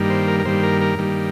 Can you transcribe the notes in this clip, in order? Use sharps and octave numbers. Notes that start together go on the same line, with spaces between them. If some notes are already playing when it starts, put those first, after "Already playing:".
Already playing: G2 D#3 G3 A#3
C5
A#4
A#4
G2 D#3 G3 A#3 C5
A#4
A#4
G2 D#3 G3 A#3